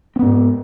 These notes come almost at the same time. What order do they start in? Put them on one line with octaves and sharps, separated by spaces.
C4 B3 G#2